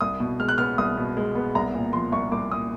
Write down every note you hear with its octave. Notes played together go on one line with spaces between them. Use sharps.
C2 D#6
B2
G#3 F6
F#6
B3 F6
C2 D#6
B2
G#3
B3
C2 A#5
A#2
F3 C6
C2 C#6
C2 D6
A#2 D#6